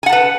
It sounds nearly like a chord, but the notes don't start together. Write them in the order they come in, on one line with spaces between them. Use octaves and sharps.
G#5 F#5 A5 B4